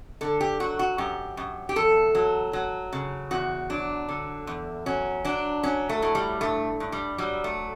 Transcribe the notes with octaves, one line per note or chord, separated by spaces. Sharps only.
D3 A4
G4
F#3 F#4
F#4
F#2 G4
F#2
G4
E2 A4
F#3
F#3
C#3
E2 F#4
F#3 D4
D3
E2
F#3 C#4
F#3 D4
F#3 C#4
A3
A2
G3
G2 A3
G2
G3
F#3 G3
A3